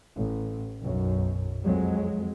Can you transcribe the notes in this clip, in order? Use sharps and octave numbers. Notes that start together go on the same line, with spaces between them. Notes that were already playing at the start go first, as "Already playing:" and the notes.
A1
B1 F#2
F2 F#3 G#3